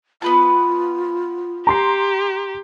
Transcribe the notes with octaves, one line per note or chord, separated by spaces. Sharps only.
B3 F4 B4 A5
G4 A#5 C6 C7